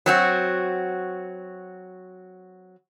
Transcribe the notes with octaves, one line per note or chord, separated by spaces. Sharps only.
F#3 C4 F#4